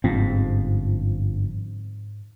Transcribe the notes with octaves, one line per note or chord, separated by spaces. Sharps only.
G1 G#2 F3 C4